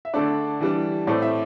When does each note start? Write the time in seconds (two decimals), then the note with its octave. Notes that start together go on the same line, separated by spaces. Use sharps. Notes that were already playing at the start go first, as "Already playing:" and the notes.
0.05 E5
0.14 D3 A3 D4 D5
0.60 E3 G3 D4
1.07 A2 A3 C4 D5
1.22 E5